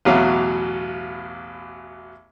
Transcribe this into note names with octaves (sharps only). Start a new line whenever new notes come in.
A1 E2 B2 F#3 F5